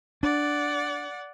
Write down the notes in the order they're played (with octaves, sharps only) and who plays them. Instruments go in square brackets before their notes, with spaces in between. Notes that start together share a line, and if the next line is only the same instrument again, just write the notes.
[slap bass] D4 [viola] D5 F#5